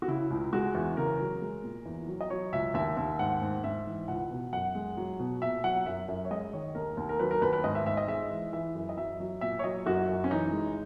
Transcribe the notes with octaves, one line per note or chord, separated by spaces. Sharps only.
F#4
C#3 E4
C#2
G#3 F#4
E2
C#3 A#4
F#3
G#3
A#2
E2
F#3
D#5
F#3 C#5
C#2 E5
D#2 E5
D#2
G#2 F#5
G#2
G#2 E5
E3
C#2 F#5
B2
F#2 F#5
G#3
F#3
B2
A#2 E5
F#3 F#5
F#2 E5
F#2
C#5
G#3 D#5
D#3 C#5
D#2 A#4
D#2
A#4
F#3 B4
A#4
D#2 B4
B4
G#2 D#5
E5
G#2 E5
D#5
G#3 E5
E3
E3 E5
F#2
D#5
F#3 E5
F#3
A#2 E5
C#5
F#3 D#5
F#2 F#4
F#2
C#4
E3 D#4
G#3